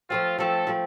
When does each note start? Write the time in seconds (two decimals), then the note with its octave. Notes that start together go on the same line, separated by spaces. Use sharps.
0.10 F3 A3 C4 F4
0.38 F3 A3 C4 A4
0.67 F3 A3 C4